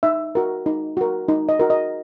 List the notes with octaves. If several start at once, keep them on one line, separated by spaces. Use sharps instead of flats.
D#4 E5
F#4 A#4
D#4
F#4 A#4
D#4
D#5
F#4 A#4
D#5